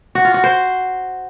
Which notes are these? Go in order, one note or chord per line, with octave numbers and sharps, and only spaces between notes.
F#4
F4
F#4
C5